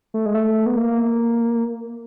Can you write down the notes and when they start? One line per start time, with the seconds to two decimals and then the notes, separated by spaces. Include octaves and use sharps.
0.14 A3
0.26 G#3
0.35 A3
0.66 B3
0.76 A#3